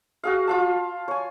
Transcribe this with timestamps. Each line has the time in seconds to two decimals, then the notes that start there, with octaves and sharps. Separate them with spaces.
0.23 F#4 G#4 F5
0.47 F4 F5 A5
1.08 C#5 G#5